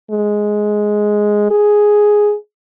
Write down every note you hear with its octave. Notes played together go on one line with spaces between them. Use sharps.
G#3
G#4